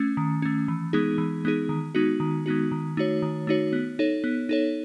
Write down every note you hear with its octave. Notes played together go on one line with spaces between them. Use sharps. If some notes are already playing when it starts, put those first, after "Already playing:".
Already playing: A3 C#4
D#3
A3 C#4
E3
G#3 B3 D#4 G#4
E3
G#3 B3 D#4 G#4
D#3
G#3 B3 D#4 F#4
D#3
G#3 B3 D#4 F#4
D#3
A3 D#4 F#4 C#5
D#3
A3 D#4 F#4 C#5
B3
D#4 A4 C#5
B3
D#4 A4 C#5